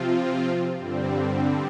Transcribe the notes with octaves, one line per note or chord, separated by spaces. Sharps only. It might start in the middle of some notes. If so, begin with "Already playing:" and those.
Already playing: C3 F3 C4 F4
G2 D3 G3 C4